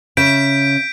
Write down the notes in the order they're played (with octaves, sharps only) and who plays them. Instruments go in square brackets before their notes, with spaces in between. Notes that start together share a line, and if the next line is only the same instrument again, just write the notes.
[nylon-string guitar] C#3 E5 [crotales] G6 B6 D7